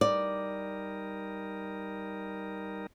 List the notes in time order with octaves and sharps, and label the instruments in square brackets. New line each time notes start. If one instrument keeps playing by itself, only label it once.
[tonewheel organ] G3 D#4 A#4 [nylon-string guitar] D5